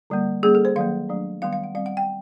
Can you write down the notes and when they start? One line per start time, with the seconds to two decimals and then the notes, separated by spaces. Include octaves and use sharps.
0.10 D3 G3 A#3
0.43 G3 A#3 C#4 G#4
0.55 A4
0.65 C5
0.76 D#3 F#3 A#3 F5
1.09 F#3 A3 D4
1.42 D#3 G3 B3 F5
1.53 F5
1.64 F#5
1.75 G3 C4 F5
1.86 F#5
1.97 G5